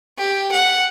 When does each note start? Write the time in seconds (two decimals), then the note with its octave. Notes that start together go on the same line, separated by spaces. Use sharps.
0.18 G4
0.52 F#5